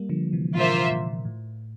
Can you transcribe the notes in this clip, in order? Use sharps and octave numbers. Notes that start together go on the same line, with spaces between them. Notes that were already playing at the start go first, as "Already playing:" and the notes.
Already playing: G3 A#3
D3 F3
C3 E3
A#2 D3 A#3 F4 C5 E5
A#2
A2